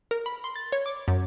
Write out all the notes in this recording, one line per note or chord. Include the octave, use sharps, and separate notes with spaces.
A#4
B5
C6
A6
C#5
D6
F#2